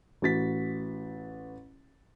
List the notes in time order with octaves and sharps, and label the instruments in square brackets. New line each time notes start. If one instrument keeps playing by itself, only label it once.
[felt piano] A1 F#4 A6 B6